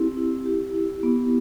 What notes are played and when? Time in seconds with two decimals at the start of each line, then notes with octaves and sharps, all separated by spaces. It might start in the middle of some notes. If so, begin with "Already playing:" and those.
Already playing: C4 E4 G4
0.17 E4
0.45 G4
0.74 E4
1.03 B3